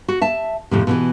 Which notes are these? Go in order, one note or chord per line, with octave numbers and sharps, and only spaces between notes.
F#4
E5 A5
F2 A2 C3
B2 D3 E3